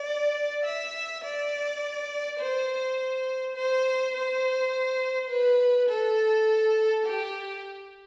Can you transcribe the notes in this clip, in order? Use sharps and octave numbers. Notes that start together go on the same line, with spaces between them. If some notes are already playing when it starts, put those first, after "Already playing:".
Already playing: D5
E5
D5
C5
C5
C5
B4
A4
G4